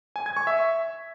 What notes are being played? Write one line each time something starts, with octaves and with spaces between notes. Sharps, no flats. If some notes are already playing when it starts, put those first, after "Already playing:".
G#5
G#6
C#6
E5